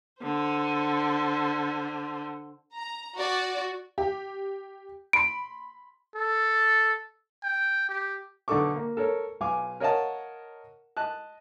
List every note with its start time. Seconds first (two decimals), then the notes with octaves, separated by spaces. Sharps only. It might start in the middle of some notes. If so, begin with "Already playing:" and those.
0.22 D3 C5
2.75 A#5
3.16 F#4 D5
3.98 G4
5.13 B5 C6 D7
6.15 A4
7.43 G5
7.89 G4
8.48 B1 D3 D#4 A4 C#6 D6
8.76 A#3
8.97 A4 A#4 C#5
9.40 B1 F5 G#5 D6
9.80 A#4 C#5 D#5 F5 F#5 A5
10.97 D#5 A5 F#6